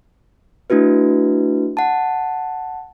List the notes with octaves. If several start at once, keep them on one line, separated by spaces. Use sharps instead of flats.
A3 D4 E4 F#4 B4
F#5 A5